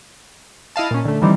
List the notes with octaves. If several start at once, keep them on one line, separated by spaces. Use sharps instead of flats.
E4 D#5 F5 A5
A#2 C#4
D3 A3
D#3 E3 G3 C4